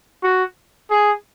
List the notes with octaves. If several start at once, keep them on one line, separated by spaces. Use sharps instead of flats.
F#4
G#4